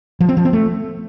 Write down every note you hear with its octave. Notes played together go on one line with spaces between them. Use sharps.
F3
C4
F3
C4
A3